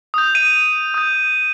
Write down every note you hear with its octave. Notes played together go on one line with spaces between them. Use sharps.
D#6 G6
D#7
D#6 G6